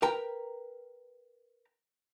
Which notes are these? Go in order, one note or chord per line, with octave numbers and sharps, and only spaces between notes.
A#4 B4 G5 A#5